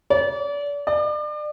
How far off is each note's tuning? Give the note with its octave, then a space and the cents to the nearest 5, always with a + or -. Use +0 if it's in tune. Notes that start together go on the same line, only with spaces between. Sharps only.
D5 -35
D5 +35